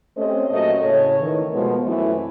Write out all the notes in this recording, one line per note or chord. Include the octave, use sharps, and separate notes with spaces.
A3 C4 C#4 G4 C5 D#5
A#2 F#3 A3 C#4 D#5
A2 C#3 A4 C#5
D#3 E3
B2 F3 G#3 A3 B3
F#2 E3 A3 C4 E4